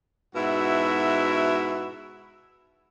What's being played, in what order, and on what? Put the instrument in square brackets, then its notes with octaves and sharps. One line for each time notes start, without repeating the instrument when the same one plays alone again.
[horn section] G#2 B2 E4 F#4 E5